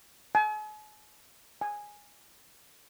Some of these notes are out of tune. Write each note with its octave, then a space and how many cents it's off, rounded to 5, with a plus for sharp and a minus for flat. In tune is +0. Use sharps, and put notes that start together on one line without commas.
G#5 +45
G#5 -5